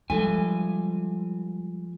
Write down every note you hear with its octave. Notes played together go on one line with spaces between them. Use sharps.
F3 G3 G#3 A4 G#5